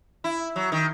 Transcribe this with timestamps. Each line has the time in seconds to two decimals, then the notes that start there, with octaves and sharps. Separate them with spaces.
0.24 E4
0.56 F#3
0.72 D#3